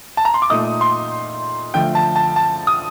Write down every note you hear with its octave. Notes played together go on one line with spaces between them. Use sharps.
A5
A#5
C6
D6
A#2 A3 D#4 D#6
C6
D3 F3 A3 G5
A5
A5
A5
D#6